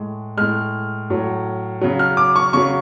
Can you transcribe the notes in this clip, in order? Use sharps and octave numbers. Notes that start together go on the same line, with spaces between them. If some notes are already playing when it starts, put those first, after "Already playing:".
Already playing: A2 G#3
A2 G#3 F6
A2 F#3
C#3 F#3
F6
D6
C#6
C#3 F#3 C#6